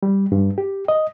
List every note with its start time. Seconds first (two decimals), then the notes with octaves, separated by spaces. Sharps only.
0.03 G3
0.32 G2
0.58 G4
0.88 D#5